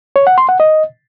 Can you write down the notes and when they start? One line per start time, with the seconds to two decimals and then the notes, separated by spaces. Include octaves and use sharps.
0.16 C#5
0.27 F#5
0.38 C6
0.49 F#5
0.60 D#5